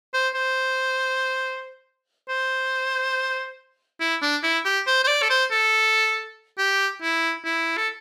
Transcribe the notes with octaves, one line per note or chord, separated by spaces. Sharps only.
C5
C5
C5
E4
D4
E4
G4
C5
C5
D5
A4
C5
A4
G4
E4
E4
A4